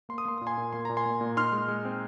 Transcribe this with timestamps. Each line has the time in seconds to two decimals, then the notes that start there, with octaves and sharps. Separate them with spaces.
0.09 A#3 C6
0.18 D#6
0.25 A#3 C6
0.38 A#2 D#6
0.47 G#5 C6
0.58 A#2
0.73 A#3 C6
0.85 A#2 A#5
0.97 G#5 C6
1.06 A#2
1.21 A#2
1.37 D#4 C6 F6
1.52 G#3
1.68 G#3
1.85 C4